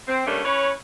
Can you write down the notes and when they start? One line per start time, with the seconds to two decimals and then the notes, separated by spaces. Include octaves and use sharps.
0.07 C4
0.26 D3 G3 A3 A#3 C#4 D4
0.44 C#4 E4 B4 C#5